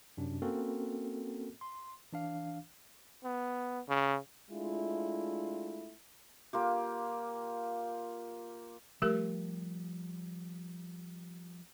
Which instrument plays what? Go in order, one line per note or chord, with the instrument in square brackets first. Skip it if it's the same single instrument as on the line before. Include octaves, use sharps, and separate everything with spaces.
[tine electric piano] F#2 C3 D4
A#3 C4 C#4 F#4 A4 A#4
C6
E3 D4 F5
[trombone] B3
C#3
[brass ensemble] G#3 A3 D4 E4 F4
[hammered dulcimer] A#3 F4 G4
[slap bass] F3 G3 [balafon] A3 G4 A#4